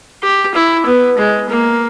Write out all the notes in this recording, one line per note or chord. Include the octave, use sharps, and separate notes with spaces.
G4
E4
B3
G#3
A#3